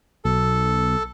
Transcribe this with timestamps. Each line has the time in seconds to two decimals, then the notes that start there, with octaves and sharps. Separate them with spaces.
0.25 B1 A4